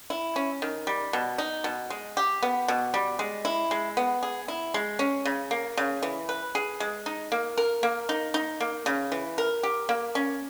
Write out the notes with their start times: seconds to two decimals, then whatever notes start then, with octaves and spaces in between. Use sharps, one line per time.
0.10 E4
0.36 C#4
0.62 D#3
0.87 G3
1.13 B2
1.38 D#4
1.64 B2
1.90 G#3
2.17 G4
2.43 B3
2.68 B2
2.94 G3
3.19 G#3
3.45 E4
3.71 G#3
3.97 B3
4.23 G#4
4.48 E4
4.74 G#3
4.99 C#4
5.25 C#3
5.51 A#3
5.77 C#3
6.03 E3
6.29 B4
6.55 G#4
6.80 G#3
7.06 D#4
7.32 A#3
7.58 A#4
7.83 A#3
8.09 D#4
8.34 D#4
8.60 A#3
8.86 C#3
9.12 E3
9.38 A#4
9.63 G4
9.89 A#3
10.15 C#4